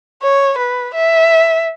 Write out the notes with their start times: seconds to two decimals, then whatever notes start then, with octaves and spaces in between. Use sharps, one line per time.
0.22 C#5
0.58 B4
0.94 E5